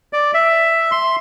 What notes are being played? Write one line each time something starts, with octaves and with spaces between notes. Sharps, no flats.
D5
E5
C6